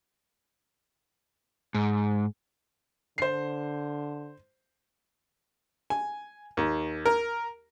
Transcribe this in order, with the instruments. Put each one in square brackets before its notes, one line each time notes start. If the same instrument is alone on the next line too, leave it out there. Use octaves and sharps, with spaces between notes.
[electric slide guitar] G#2
[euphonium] D3 [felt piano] C5 C7
[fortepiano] G#5
D#2
A#4